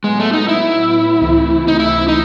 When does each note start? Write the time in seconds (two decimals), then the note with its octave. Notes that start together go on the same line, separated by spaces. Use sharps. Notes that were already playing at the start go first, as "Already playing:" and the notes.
0.04 A2 F#3 G#3 B3
0.20 A3
0.33 D#4
0.49 E4
1.21 C#2 C3 E3 A3 C4
1.68 D#4
1.79 E4
2.08 D#4